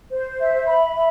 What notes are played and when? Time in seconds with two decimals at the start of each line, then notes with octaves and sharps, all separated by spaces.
0.10 C5
0.38 E5
0.67 B5
0.95 E5